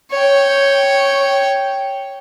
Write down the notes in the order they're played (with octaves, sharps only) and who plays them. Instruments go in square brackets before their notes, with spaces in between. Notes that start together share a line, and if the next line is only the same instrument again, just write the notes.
[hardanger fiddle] C#5 G5